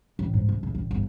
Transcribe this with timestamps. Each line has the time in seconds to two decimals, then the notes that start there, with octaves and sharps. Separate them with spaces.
0.19 A1
0.34 G#2
0.49 C2
0.63 B1
0.75 A1
0.91 G1